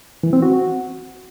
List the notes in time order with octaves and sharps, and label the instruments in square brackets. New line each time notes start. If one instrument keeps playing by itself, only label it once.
[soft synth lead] E3
C4
F#4